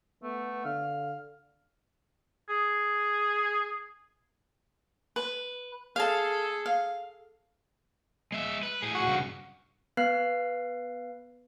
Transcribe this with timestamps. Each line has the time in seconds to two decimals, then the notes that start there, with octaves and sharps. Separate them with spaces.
0.23 A3 B3
0.65 D3 F5
2.49 G#4
5.16 B4
5.96 G#4 A4 F5 A5
6.66 F5
8.32 G#3 E5
8.63 B4
8.82 A2 G#4
8.95 F#4
9.07 G2 C#3
9.97 B3 B4 F5 F#6 C7